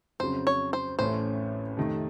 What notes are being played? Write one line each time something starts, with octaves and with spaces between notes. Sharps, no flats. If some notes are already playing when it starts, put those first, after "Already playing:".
F2 C#3 F#3 C5
C#5
C5
A1 A2 A3 C#4 C5
F2 C3 D#3 A3